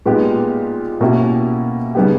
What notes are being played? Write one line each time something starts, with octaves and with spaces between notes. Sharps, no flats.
A#2 G#3 B3 D#4 G4
B2 A#3 C#4 E4 G4
C#3 G3 B3 D#4 G4